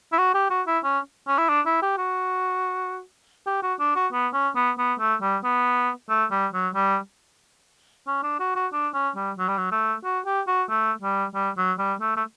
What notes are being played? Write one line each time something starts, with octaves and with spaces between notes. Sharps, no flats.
E4
F#4
G4
F#4
E4
C#4
C#4
E4
D4
E4
G4
F#4
G4
F#4
D4
F#4
B3
C#4
B3
B3
A3
G3
B3
A3
G3
F#3
G3
C#4
D4
F#4
F#4
D4
C#4
G3
F#3
G3
F#3
A3
F#4
G4
F#4
A3
G3
G3
F#3
G3
A3
A3